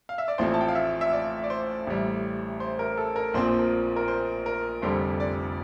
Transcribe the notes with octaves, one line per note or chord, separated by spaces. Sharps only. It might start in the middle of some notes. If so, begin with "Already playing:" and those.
F5
E5
D5
A1 A2 F3 A3 C4 C5
A5
G5
F5
E5
E5
D5
D5
C5
A1 A2 G3
C5
A#4
A4
A#4
A#1 A#2 F3 C4 C5
C5
A#4
A#4
C5
A#4
F1 F2 D3 G3 C5
C5
D5